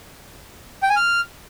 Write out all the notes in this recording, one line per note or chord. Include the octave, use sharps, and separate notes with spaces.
G5
G#5
F6